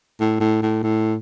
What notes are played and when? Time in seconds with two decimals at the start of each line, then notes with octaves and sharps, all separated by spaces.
0.20 A2
0.41 A2
0.62 A2
0.83 A2